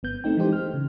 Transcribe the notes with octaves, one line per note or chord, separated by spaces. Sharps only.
G1 B3 G6
A3 C4 D#4 G5
E3 G#3 D#4 G4 C5
F6
C#3